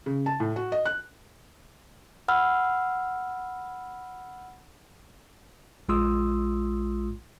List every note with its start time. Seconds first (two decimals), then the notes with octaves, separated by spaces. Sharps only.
0.06 C#3
0.26 A5
0.40 A2
0.56 F#4
0.72 D#5
0.85 F#6
2.28 F#5 B5 E6 F6
5.89 A#1 G#3 F4 C6 D#6 E6